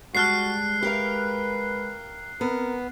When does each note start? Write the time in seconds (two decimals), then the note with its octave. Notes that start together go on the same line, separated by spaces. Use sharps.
0.15 G3 G#3 F#4 A5 F6 F#6 C7
0.82 G4 A#4 B4 F5
2.41 B3 C4 A#4